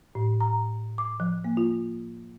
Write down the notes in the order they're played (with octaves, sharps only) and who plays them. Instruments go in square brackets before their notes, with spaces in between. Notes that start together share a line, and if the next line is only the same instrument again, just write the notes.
[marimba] A2
A#5
D6
F3
A#3
F4